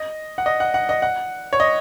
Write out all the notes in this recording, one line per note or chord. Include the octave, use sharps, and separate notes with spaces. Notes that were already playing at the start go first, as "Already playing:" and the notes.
Already playing: D#5
F#5
D#5
F#5
F#5
D#5
F#5
C#5
D#5